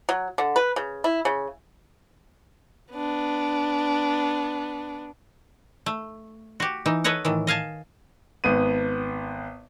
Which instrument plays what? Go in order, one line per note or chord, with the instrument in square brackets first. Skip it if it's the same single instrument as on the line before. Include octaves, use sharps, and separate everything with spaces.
[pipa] F#3
D3
B4
C#3
E4
C#3
[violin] B3 D4
[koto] A3
F#4 G4
E3 D#4
A4 B4 C#5 D#5 F#5
A2 D#3 E3
D#5 F5 G#5 A5
[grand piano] G#1 B3 D#7